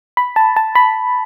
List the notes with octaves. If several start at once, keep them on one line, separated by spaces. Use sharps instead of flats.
B5
A5
A5
B5